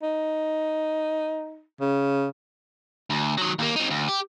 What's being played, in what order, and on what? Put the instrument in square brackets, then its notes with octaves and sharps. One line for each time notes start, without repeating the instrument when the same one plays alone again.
[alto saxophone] D#4
[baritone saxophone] C#3
[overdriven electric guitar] D2
D#3 F#3
D#2 A#3
C4 D#4
D2
G4